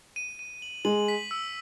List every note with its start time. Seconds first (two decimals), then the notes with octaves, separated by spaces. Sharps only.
0.16 D#7
0.39 D#7
0.62 F#7
0.85 G#3 F#7
1.08 B6
1.31 E6